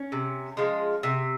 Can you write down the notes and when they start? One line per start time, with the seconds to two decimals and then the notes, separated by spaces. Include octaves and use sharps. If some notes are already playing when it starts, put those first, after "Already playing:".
Already playing: C#4
0.12 C3
0.57 F3 G#3
1.03 C3